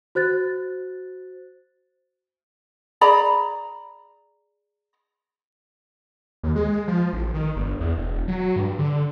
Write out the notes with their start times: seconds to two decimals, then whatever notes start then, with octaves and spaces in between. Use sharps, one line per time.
0.15 F#4 C5 F#6 A6
3.01 G#4 D5 A#5 B5
6.43 D#2
6.56 G#3
6.88 F3
7.13 A1
7.34 D#3
7.56 G1
7.80 E2
7.98 E1
8.28 F#3
8.56 G2
8.79 D3